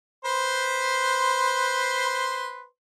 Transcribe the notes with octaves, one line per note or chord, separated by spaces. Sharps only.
B4 C5 C6